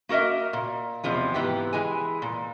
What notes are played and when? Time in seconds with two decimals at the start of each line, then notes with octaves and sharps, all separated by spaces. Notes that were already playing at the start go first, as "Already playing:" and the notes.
0.09 A#3 F#4 A#4 D#5 E5
0.53 A#2
1.04 E2 C3 F3 G#3
1.34 G#2 E3 B3 G4
1.73 E3 G#3 G#5
2.22 A#2